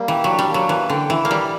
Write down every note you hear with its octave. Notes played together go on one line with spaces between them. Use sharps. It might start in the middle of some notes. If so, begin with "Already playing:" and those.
Already playing: G3 A#3
E3 G4
F#3 D4
G3
F#3 A#3
E3 B4
D3 G5
E3 E4
A#3
G3 D5